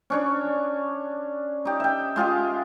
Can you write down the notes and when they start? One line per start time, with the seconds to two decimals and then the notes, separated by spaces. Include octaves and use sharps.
0.10 C#4 D4 C#5
1.65 D#4 G4
1.80 E5 G5
2.16 G#3 F4 G4 G#4